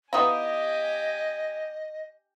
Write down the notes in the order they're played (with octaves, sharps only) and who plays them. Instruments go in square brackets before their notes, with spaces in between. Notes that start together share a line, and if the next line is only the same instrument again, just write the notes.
[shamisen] B3 D#4 E4 [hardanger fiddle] G4 G#5 [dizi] D#5 [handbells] F5 D#6